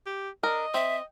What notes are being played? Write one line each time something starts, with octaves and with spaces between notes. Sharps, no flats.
G4
D4 A#4 D#5
C4 E5